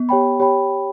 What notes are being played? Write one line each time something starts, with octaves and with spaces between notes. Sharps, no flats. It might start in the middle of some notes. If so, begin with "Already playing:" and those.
Already playing: B3
G4 C#5 G5 B5
G4 C#5 G5 B5